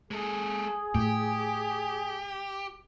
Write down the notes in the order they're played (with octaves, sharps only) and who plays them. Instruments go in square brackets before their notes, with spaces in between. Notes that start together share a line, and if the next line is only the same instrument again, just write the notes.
[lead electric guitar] G#3 A4 [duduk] G#4
[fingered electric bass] A2 [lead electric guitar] G4